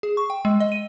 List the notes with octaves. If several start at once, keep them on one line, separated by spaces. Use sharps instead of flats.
G#4
C#6
G5
G#3
D#5
D#7